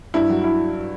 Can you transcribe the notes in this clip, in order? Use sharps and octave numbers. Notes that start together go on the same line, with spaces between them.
G2 E4
F#3
E4